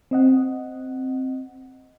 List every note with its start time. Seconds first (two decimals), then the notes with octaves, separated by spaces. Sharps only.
0.11 C4 D#5 F#5